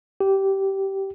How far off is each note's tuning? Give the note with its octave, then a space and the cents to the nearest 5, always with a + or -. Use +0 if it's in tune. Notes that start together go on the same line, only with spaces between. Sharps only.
G4 -15